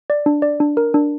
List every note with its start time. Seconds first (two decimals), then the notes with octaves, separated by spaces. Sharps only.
0.10 D5
0.26 D4
0.42 D5
0.60 D4
0.77 A#4
0.94 D4